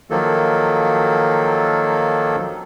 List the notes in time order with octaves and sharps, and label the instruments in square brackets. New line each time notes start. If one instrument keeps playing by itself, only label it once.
[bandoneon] D#3 F3 F#3 A#3 A4